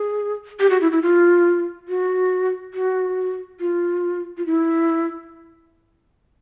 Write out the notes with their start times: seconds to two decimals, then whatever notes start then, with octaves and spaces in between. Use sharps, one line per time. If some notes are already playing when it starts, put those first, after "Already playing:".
Already playing: G#4
0.60 G4
0.70 F#4
0.81 E4
0.92 E4
1.03 F4
1.88 F#4
2.74 F#4
3.60 F4
4.37 F4
4.46 E4